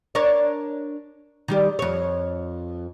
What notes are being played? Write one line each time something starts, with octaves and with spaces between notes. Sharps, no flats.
D4 A#4 C#5
D#3 G3 G4
F2 C#5